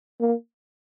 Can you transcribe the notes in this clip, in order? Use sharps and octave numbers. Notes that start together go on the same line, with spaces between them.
A#3